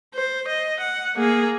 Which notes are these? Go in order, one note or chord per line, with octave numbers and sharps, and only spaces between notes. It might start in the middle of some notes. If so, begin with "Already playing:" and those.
C5
D#5
F#5
A#3 G#4